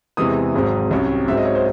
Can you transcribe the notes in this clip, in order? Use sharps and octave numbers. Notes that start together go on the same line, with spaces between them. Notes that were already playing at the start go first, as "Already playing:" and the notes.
E2 C3 E3 G#3 D#6
G#1 G#2 F#3 C4
C2 C3 F#3 C#4
G#2 F#3 C4 E5
D#5
C#5
C5